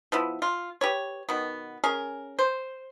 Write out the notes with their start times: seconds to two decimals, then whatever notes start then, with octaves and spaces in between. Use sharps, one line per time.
0.12 F3 B3 E4
0.42 F4
0.81 G4 B4 C#5
1.29 B2 D#3 B3
1.84 C#4 G#4 A#4
2.39 C5